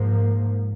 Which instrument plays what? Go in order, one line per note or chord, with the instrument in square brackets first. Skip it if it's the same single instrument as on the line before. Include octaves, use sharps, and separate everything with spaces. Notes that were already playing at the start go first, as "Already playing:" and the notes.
Already playing: [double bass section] G#2 F3 A#3